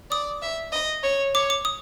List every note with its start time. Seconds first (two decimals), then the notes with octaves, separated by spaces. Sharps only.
0.11 D5 D#6
0.42 E5
0.72 D#5
1.03 C#5
1.35 C#5 D6
1.50 D6
1.65 D#6